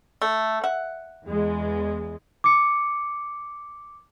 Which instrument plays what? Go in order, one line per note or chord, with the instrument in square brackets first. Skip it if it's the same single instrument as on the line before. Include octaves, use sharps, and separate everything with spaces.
[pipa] A3
E5 F#5
[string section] E2 G#3
[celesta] D6 C#7